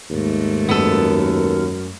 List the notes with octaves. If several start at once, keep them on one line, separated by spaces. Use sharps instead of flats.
D#2 G#2 A3
F#2 B3 A4